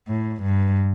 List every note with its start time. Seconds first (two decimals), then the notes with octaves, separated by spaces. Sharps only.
0.08 A2
0.43 G2